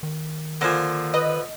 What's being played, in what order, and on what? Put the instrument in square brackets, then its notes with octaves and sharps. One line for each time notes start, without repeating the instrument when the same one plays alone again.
[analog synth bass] D#3
[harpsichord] D3 F3 [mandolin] A#3 C5 G#5
[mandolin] B4 [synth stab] D#5